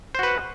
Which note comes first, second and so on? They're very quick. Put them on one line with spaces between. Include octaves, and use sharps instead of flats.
C5 F#4 B4 F#5